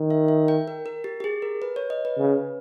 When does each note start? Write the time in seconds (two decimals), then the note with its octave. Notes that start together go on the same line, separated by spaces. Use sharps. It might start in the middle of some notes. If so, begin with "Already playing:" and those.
Already playing: D#3
0.11 E5
0.28 E5
0.48 G5
0.68 A#4
0.86 A#4
1.04 G4
1.20 G4
1.24 G#4
1.42 A#4
1.62 B4
1.76 C#5
1.90 D#5
2.05 B4
2.18 C#3